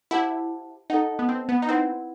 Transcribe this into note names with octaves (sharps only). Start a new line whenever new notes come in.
E4 G4 C5 F#5 A5
D#4 A4 D#5 F#5
B3
C4
B3
D#4
C4 E4 B4 F#5